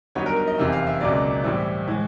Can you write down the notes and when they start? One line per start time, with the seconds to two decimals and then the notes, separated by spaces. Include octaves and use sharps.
0.15 G2 D#3 F#3 B3 D#4 C#5
0.26 A#4
0.37 A#4
0.47 D#5
0.58 F1 E2 C3 D#3 E5
0.72 F5
0.87 E5
1.01 C#2 B2 F#3 A#3 D5
1.43 A2 E3 G3 C4 E4
1.87 A2 E3 G#3